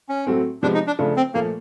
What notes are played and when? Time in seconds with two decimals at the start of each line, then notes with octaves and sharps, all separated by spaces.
0.09 C#4
0.27 A2 F#3 A3 C4
0.62 C3 F3 G#3 B3 D4
0.74 D#4
0.87 D4
0.99 C#3 F3 A3 D4 F4
1.17 C4
1.34 A#2 F3 A3 A#3